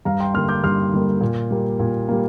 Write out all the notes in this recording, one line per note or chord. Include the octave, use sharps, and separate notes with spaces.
G2 F5 A#5
G5 C6
D3 G3 A#3 C6 F6
D6 G6
G2 C6 F6
D3 G3 A#3
A#2
G3 A#3
A#2
G3 A#3